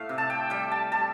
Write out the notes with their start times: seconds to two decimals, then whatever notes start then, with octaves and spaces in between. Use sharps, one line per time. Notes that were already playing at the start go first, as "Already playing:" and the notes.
Already playing: A2 A3 F5
0.09 C3
0.18 A5
0.30 G5
0.50 G3 G5
0.71 A5
0.92 G3 A5